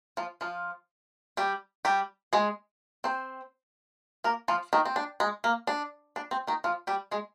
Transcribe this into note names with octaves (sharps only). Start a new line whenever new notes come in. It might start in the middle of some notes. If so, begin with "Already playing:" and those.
F3 F4
F3 F4
G3 G4
G3 G4
G#3 G#4
C4 C5
A#3 A#4
F3 F4
D#3 D#4
C4
D4
G#3
A#3
D4
D4
C4
D#3 D#4
F3 F4
G3 G4
G#3 G#4